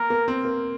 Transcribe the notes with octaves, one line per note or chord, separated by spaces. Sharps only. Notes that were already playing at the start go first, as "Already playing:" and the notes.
Already playing: A#3 A#4
A#3
C4
A#3